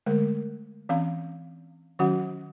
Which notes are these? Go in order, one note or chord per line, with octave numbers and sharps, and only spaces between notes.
D3 G#3 A3 A#4
E3 C4 C#4 F5
D#3 F#3 C#4 F#4 F#5